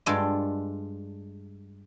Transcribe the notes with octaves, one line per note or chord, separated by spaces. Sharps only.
G2 G#3 F4 A4 D5